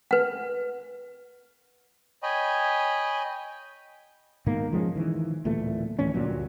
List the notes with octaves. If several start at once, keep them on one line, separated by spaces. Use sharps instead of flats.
B4 F#5
C#5 D#5 G5 G#5 B5
G#2 B2 D#3 A#3
F3 G#3 A#3 C#4
D#3 E3
D1 A#2 E3 A3
D2 A2 E3 C#4
D2 G2 A#2 F#3